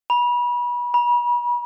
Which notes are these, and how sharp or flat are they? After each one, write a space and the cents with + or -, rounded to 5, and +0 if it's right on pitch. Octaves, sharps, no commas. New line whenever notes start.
B5 -30
B5 -40